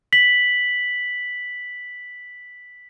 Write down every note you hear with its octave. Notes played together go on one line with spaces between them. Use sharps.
B6 F#7